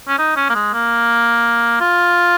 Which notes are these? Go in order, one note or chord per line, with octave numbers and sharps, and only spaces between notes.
C#4
D#4
C#4
A#3
G#3
A#3
F4